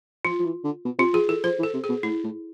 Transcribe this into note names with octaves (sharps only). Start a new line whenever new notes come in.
F3 F4
F3
E3
D3
B2
C3 F4
F3 G#4
E3 A4
F3 C5
E3
A4
C3
G#4
B2
A2 E4
A2